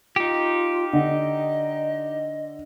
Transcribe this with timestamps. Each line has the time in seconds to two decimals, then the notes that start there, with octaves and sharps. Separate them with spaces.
0.16 D#4 F4 G4
0.93 D3 D#5